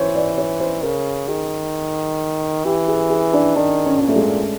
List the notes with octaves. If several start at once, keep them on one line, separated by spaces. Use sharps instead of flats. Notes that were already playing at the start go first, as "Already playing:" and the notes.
Already playing: E3 C5 C#5
D5
C#5
C5
C#3 A#4
D#3 G#4
E3 G4
G#4
G#4
D4
D#3 D4
C#4
A#2
A3
G#3